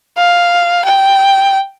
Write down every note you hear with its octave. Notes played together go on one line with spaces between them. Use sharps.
F5
G5